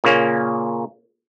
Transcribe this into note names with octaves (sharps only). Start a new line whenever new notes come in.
A#2 C#3 A#3 C#4